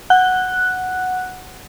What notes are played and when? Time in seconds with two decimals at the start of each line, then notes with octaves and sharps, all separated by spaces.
0.10 F#5 F#6